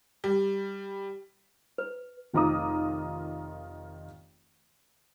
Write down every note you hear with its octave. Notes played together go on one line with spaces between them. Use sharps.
G3
B4
F1 D#3 F4 A#5 D6 D#6